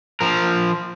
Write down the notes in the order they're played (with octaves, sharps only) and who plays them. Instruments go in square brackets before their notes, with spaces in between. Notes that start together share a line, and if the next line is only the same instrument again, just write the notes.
[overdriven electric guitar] F3 A#4